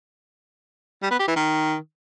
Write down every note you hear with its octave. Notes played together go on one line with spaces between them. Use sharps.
G3
B3
G4
E3
D#3